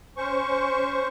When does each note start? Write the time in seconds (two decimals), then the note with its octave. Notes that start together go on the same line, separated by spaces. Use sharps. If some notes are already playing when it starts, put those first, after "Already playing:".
0.17 C#4 C5 C#6